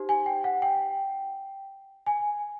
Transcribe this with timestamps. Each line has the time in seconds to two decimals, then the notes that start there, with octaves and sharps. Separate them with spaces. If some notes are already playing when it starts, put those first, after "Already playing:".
Already playing: D#4 G4 C5
0.09 G#5
0.26 G5
0.44 F#5
0.62 G5
2.06 G#5